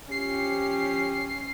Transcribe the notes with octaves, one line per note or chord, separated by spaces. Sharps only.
F3 C#4 G4 C7